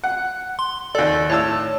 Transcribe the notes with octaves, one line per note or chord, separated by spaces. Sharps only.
F#5
C6
D#2 A4 D5
A2 C#5 A5 E6